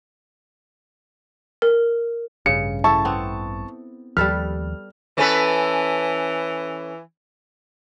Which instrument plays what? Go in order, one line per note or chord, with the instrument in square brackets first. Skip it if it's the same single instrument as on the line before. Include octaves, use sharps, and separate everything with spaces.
[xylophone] A#4
[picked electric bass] A1 G2 [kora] C#3 [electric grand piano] C#7
[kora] E4 A4 [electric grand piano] A5 C#6
[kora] B3 C4
[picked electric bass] D#2 F3 [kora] G3 A4 B4 [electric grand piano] F6
[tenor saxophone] E3 [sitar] C#4 A4 B4